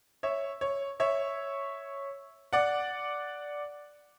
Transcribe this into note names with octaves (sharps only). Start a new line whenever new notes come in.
C#5 E5
C#5
C#5 E5
D5 F#5